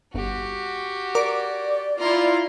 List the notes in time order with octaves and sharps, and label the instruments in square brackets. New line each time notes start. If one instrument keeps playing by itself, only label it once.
[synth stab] G1 [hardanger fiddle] F#4 G4
[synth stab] A#4 D6 [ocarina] D5
[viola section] E4 F4 [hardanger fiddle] A#5 C6